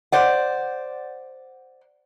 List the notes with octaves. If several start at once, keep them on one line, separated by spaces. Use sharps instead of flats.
C5 D5 F#5